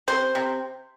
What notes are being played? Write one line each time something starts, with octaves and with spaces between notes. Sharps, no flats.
C3 C5
C3